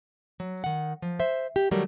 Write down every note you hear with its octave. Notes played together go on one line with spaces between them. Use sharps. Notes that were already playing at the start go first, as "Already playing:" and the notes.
F#3
D#3 F#5
F3
C5 E5
G4
D#3 F#3 G3 A3 A#4